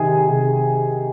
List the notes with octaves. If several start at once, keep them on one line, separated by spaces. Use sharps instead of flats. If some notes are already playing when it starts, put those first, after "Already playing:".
Already playing: C3 D#3 G#4 G#5
C3